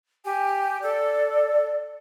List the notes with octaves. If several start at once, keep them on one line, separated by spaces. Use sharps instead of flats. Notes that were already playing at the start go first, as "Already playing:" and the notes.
G4 G#5
A4 D5